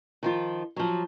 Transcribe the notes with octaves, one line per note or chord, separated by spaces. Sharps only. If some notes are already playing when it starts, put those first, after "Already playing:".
D#3 F3 F4
F3 F#3